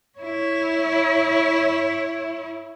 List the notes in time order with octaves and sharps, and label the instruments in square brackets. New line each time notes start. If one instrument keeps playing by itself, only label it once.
[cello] E4 C#5